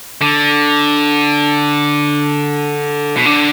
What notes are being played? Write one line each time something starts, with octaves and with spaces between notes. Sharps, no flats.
D3
B2
D3